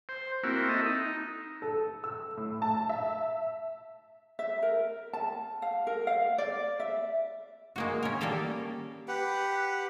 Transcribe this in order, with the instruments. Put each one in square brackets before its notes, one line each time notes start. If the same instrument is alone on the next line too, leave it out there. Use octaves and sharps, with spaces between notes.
[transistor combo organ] C5
A#3 C4 E4 F#4
A4 D#5 E5
D#4
[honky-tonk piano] A4
E6
A2
A5
E5
[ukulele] E5
A#4
A5
F5
A#4
F5
D5
E5
[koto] G#3 A#3 F#4
C#4 A#4
G3 A#3 G4 A4 A#4
[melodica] G4 B4 F#5